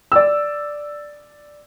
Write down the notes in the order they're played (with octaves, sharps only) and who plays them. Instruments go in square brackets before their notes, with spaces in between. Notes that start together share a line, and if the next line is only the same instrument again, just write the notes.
[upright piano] D5 E6